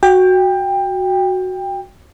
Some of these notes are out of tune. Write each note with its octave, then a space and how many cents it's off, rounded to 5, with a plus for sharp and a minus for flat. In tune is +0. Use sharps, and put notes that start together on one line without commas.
F#4 +0 G5 +20